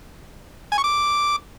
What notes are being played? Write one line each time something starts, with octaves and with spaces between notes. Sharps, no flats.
G#5
C#6
D6